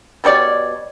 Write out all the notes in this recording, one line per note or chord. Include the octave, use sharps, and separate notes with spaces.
B2 G3 C#5 D5